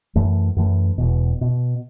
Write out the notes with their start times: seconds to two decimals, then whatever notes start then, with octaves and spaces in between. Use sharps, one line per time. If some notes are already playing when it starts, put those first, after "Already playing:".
0.16 F#2 E3 A3
0.56 F#2 E3 A3
0.98 E1 E2 B2
1.41 B2